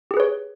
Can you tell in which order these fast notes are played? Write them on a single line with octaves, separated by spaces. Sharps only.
G4 G#4 B4 C#5